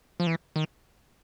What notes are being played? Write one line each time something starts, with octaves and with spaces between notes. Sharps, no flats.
F3
E3
D#3